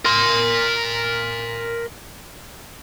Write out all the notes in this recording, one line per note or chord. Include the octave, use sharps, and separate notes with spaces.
A#4 C6